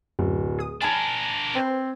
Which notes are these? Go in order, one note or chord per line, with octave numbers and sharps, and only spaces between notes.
D1 F#2
G#4 D#6
D4 A#4 G#5 A5 B5 F6 G#6
C4 B4 C5